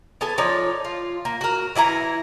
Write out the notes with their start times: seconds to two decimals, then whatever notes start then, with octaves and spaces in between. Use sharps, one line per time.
0.21 B3 A4 G#5 A5
0.38 F3 D#4 C#5 D5
0.85 F4
1.25 A#3
1.41 F#4 A#4
1.75 E3 E4 G#5 A#5